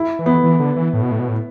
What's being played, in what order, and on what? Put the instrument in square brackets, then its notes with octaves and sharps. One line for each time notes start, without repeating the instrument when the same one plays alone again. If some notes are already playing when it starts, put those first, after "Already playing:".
Already playing: [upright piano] E4
[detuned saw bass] E3
[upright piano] B3
[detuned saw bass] E3
D3
E3
A2
B2
A2
B2
A2